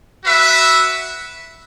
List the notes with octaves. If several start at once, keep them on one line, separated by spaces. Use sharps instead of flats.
F#4 B4 E5